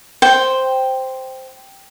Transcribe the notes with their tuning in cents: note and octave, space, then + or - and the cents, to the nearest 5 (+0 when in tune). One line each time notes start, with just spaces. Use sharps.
C5 +0 G5 +0